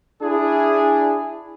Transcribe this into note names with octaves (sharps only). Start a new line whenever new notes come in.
D4 E4 G#4